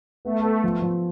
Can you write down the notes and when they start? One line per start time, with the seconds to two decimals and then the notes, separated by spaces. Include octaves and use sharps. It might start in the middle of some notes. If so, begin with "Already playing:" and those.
0.25 A3 B3
0.44 B3
0.64 F3
0.82 F3